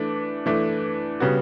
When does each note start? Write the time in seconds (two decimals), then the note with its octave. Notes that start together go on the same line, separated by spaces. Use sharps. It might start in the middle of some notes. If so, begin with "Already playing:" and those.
Already playing: E3 A3 D4
0.46 E3 A3 D4
1.20 C#3 G3 B3 F#4